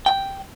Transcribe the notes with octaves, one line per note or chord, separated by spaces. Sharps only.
G5